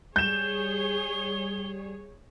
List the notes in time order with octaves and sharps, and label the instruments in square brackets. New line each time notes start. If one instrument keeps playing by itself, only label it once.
[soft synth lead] G3 [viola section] G#4 C#5 [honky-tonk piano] G6 E7 [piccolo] G7